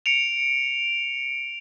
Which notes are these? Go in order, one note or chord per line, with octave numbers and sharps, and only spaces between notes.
C#7 D7 F7